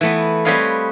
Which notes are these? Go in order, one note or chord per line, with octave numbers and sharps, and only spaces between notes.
E3 A3 B3
G3 C4 B4 C#5 D#5 F5